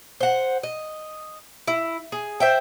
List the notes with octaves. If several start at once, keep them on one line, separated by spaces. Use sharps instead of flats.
C5 F#5
D#5
E4
G#4
C5 E5 G5